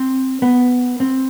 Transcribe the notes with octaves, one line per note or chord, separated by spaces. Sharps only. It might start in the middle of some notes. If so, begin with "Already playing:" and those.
Already playing: C4
B3
C4